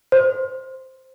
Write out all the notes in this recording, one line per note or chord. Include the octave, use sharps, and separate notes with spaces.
C5